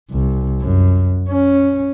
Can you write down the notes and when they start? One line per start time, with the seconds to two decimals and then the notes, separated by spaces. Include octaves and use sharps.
0.11 C2
0.60 F#2
1.29 C#4